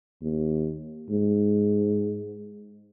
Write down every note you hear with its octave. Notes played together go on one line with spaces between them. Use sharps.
D#2
G#2